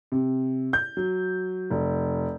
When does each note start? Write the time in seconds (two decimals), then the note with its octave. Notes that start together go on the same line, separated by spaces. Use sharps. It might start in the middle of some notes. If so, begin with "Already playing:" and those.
0.12 C3
0.73 G6
0.97 F#3
1.71 F1